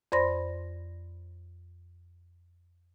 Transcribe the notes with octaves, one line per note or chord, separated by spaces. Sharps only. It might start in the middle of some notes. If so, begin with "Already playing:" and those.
F2 C5 D5 B5 C6 A#6